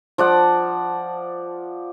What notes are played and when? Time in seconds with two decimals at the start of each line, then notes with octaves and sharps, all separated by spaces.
0.18 F3 D5 F#5